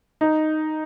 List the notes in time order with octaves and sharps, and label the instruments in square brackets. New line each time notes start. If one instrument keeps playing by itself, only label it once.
[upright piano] D#4